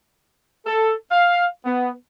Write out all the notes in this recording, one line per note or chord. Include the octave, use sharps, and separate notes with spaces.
A4
F5
B3